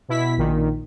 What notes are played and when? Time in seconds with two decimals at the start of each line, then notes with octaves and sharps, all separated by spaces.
0.08 B2 E4 B6
0.37 A#1 A#2 D#3